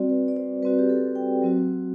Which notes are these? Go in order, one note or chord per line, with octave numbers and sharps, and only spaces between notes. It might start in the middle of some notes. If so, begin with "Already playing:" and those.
Already playing: G3 C4 F#4 D5
B4
D5
C5
G3 C4 F#4 B4
G4
A4
G5
F#3 C4 F#4